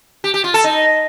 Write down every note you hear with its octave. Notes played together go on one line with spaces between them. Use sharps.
G4
G4
F4
A4
D#4